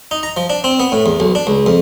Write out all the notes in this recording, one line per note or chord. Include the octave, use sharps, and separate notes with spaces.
D#4
A#5
F3
D4
C4
B3
A2
E2
B1
D4
C#2
F2